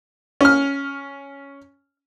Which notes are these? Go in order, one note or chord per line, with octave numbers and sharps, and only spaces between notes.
C#4 F6